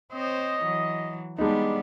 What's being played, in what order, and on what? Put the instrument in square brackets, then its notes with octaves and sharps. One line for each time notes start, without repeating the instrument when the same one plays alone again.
[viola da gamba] C4 C5 C#5 [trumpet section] D#5
[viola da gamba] E3 F#3
[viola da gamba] G3 B3 [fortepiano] G#3 D#4 [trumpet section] D4